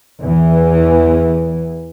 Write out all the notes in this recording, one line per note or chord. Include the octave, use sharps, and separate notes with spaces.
E2 E3